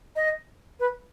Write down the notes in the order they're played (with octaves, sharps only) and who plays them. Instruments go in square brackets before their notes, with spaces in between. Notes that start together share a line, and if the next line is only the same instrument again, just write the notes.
[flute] D#5
B4